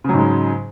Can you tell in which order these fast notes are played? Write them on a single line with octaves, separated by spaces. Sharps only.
C#3 F#3 G#2 G#3